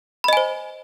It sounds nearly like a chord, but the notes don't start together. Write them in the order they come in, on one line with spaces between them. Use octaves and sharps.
B5 D#5 G#5 C5